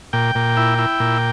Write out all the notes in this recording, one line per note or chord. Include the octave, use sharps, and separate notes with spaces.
A#2 G5
A#2
E4
E4
A#2